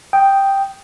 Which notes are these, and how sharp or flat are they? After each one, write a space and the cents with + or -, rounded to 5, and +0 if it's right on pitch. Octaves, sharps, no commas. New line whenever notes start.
G5 +0 D#6 +0